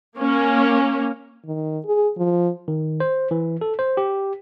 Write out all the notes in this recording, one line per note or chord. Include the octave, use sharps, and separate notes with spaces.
A#3 C#4
D#3
G#4
F3
D#3
C5
E3
A4
C5
G4